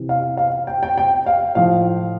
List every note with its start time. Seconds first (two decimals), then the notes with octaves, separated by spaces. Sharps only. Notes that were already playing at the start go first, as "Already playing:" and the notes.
Already playing: C3 E3
0.09 F5
0.37 F5
0.67 G5
0.83 G5
0.98 G5
1.26 F5
1.55 A2 F3 F5